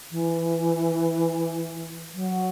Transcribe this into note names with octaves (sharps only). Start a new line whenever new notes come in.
E3
F#3